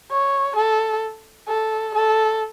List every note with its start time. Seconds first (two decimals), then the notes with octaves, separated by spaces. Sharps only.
0.11 C#5
0.56 A4
1.48 A4
1.95 A4